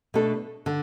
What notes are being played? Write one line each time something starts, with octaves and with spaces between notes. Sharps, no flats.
B2 A3 D4 A4
D3